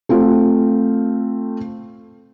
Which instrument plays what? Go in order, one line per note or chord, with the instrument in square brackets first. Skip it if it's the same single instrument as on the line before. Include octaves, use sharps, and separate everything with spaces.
[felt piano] A3 C4 F4